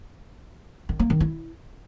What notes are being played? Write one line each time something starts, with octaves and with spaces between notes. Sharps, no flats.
D#3
A#3
D#3
E4